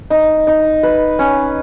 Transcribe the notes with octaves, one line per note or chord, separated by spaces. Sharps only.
D#4
D#4
B4
C#4